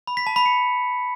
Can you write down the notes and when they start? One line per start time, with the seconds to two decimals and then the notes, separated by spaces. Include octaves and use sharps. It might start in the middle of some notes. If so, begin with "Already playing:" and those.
0.07 B5
0.17 B6
0.27 A5
0.36 B5
0.46 C#7